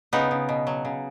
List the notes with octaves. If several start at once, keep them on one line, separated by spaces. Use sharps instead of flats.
C#3 B3 D#4
C#3
B2
F#3
C#3